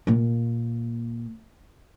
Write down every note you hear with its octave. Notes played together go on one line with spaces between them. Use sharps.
A#2 A#3